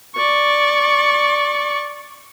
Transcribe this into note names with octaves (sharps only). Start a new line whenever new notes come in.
D5 C#6